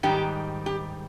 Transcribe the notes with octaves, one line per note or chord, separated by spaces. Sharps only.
G#2 D#3 G3 G4
G4